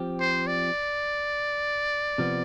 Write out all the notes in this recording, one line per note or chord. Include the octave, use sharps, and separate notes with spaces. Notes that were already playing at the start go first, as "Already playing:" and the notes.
Already playing: F3 C4 G4
C5
D5
C3 F3 B3